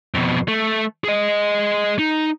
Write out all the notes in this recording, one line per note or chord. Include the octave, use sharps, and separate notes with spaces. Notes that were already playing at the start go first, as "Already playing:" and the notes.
F2 B2
A3
G#4 D#5
D#4